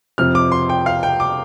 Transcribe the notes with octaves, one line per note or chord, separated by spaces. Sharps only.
F2 C3 F3 F6
D6
C6
G5
F5
G5
D6